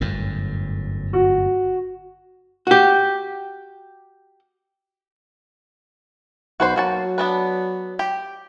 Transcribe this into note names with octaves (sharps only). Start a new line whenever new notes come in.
G1 F#2 A2
F#4
F#4 G4
B1 F#4 B4 C5
F#3 A#3 F#4 A5
B3 D4 B4
G4